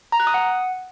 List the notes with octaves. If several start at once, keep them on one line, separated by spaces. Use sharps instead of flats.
A#5
F#6
D#6
F#5